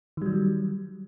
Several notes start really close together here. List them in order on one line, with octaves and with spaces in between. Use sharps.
D#3 G3 F#3